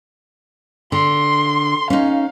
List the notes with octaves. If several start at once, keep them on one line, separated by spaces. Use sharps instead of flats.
D3 C6
C#4 D#4 F5